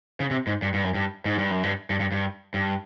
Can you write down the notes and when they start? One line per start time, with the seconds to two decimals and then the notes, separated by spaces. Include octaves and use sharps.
0.20 C#3
0.31 C3
0.47 G#2
0.62 G2
0.74 G2
0.84 F#2
0.95 G2
1.25 G#2
1.38 G2
1.51 F#2
1.63 G2
1.90 G2
2.00 G2
2.12 G2
2.54 G2